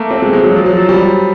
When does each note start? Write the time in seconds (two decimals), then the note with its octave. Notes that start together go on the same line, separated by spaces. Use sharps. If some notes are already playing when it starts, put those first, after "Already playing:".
Already playing: A3 A#3
0.11 C4
0.22 G#3
0.33 G#3
0.44 F#3
0.55 F3
0.66 F#3
0.77 F3
0.89 G3